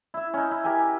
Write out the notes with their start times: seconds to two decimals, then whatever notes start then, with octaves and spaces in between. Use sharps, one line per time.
0.14 E4 E5
0.34 C#4 D#4
0.51 E4
0.64 G4 A#4 E5 G#5